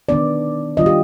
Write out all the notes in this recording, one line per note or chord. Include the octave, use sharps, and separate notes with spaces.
D#3 B3 D4 D5
D#3 G3 D4 F4 D#5
G4